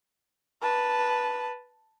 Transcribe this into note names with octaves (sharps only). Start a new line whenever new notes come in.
B4 A5